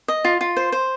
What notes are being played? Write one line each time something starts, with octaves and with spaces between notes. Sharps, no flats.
D#5
F4
F4
C5
C5